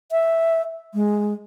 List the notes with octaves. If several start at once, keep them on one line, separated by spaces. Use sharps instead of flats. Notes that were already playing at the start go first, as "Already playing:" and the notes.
E5
G#3